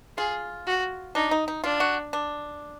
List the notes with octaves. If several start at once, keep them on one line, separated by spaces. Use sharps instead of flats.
F4 G#4
F#4
D4 D#4
D#4
D#4
D4 F4
F#4
D4